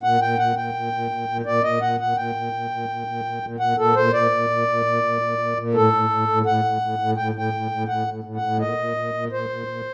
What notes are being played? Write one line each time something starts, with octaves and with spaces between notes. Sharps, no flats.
A#2 F#5
A#2 G5
A#2 F#5
A#2 G5
A#2
A#2
A#2
A#2
A#2 D5
A#2 D#5
A#2 F#5
A#2 F#5
A#2 G5
A#2
A#2
A#2
A#2
A#2
A#2
A#2
A#2 F#5
A#2 A4
A#2 C5
A#2 D5
A#2
A#2
A#2
A#2
A#2
A#2
A#2
A#2
A2 A4
A2
A2
A2
A2 F#5
A2
A2
A2
A2 G5
A2 G5
A2
A2
A2 F#5
A2
A2
F#5
A2
A#2 D#5
A#2
A#2
A#2
A#2 C5
A#2
A#2